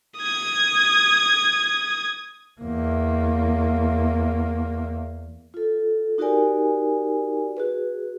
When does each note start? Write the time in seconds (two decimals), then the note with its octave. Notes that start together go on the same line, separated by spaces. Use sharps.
0.18 D#6 G#6
2.60 E2 A#3
5.54 F4 A4
6.18 D#4 F#4 G4 A#4 D5 G#5
7.57 F#4 G#4 B4